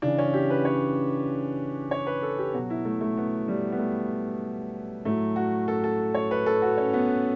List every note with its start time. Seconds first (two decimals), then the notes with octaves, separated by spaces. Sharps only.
0.02 C#3 E3 D4
0.18 C#4
0.34 G4
0.50 B4
0.65 C#5
1.91 C#5
2.07 B4
2.22 A4
2.38 G4
2.54 B2 F#3 F#4
2.70 E4
2.85 A3
3.01 A3
3.17 B3
3.48 G3
3.72 B3
3.79 A3
5.05 A2 F#3 A3
5.36 F#4
5.68 A4
5.84 A4
6.14 C#5
6.31 B4
6.46 A4
6.62 F#4
6.78 C#4
6.93 B3